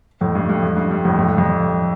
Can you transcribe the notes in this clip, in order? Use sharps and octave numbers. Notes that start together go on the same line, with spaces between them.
F2 A2
G2
G2
F2
G2
G2
F2 A2
F2 A2
G2
F2